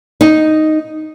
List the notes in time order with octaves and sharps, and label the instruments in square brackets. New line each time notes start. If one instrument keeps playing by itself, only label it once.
[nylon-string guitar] D#4